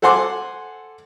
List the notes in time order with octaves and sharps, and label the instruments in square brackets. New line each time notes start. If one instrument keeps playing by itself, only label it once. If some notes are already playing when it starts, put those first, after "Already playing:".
[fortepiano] A4 C5 F#5 G#5 C6 D6